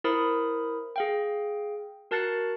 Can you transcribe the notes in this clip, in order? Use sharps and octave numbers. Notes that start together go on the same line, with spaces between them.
E4 A#4 C5 B5 D#6
G#4 F5 G5
F#4 A#4 A5 F#6 A6 C#7